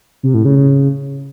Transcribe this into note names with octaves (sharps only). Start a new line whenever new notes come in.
C3
A2
C#3
C#3